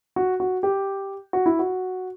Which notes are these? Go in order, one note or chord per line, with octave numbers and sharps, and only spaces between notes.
F#4
F#4
G4
F#4
E4
F#4